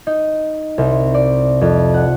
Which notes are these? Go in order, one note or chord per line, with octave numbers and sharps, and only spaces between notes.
D#4
C2
D5
F2
F#5